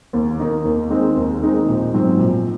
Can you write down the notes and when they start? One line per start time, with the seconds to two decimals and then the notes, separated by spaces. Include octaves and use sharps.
0.13 D#2
0.39 D#3 A#3 D#4
0.65 D#2
0.90 D#3 G#3 C4 D#4
1.17 D#2
1.42 D#3 G#3 C4 D#4
1.68 A#1
1.94 G#2 F#3 C4
2.19 A#1